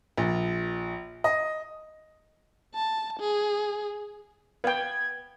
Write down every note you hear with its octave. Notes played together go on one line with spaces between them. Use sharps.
A#1
D#5
A5
G#4
B3 F5 G5 G#6